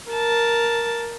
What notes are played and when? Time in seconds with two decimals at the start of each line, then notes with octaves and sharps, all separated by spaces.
0.10 A#4 A5